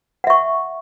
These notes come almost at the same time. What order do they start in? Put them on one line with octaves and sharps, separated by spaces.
F#5 E5 C#6